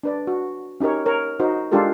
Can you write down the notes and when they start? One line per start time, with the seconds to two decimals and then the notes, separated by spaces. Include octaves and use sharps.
0.03 D4 B4 D5
0.27 F#4
0.80 C#4 D#4 G4 A#4 C#5
1.06 A#4 C#5
1.40 D#4 F#4 C5
1.72 G#3 D4 F4 G4 A4 A#4